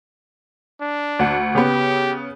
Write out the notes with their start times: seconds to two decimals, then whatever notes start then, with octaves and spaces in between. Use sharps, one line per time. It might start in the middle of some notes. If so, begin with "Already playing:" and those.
0.81 D4
1.19 D2 F#5
1.55 C#3 B3 G4